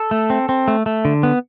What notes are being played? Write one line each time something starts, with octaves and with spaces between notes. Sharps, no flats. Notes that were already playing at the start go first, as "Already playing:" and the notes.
Already playing: A4
A3
C4
C4
A3
A3
D3
B3